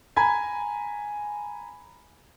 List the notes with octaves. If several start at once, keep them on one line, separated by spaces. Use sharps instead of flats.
G#5 A#5 B5 G#6